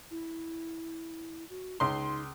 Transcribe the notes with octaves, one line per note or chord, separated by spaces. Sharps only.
E4
F#4
C#2 D#4 C6